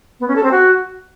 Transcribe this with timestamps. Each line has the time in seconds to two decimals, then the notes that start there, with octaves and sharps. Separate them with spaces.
0.20 B3
0.28 C#4
0.36 A4
0.43 C4
0.51 F#4